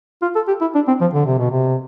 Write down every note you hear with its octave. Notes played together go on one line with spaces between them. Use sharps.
F4
A4
G4
E4
D4
C4
F3
D3
C3
B2
C3